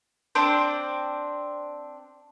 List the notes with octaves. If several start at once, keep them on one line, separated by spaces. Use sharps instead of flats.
C4 D4 C5 D5